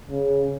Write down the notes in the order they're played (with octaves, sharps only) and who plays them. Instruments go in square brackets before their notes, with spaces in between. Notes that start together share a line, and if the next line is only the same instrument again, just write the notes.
[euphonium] C#3